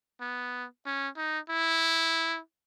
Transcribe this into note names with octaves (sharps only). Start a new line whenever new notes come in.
B3
C#4
D#4
E4